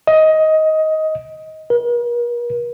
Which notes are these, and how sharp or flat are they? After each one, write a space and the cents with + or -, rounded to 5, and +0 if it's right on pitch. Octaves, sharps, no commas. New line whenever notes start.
D#5 +15
A#4 +45